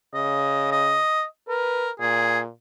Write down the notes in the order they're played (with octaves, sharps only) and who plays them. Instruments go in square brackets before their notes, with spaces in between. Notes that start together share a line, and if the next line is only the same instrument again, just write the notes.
[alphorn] C#3 [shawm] D#5
[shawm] D#5
[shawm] A#4 [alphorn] B4
[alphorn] A#2 [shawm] G#4